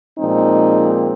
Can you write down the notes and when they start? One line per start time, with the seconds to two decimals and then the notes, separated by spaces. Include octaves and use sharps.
0.18 A#2 F3 G#3 C4 D#4